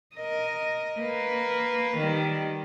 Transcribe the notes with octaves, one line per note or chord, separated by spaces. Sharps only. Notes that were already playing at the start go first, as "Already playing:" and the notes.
A#4 D#5
A#3 B4
D#3 G3